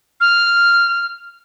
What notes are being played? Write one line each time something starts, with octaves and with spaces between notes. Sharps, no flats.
F6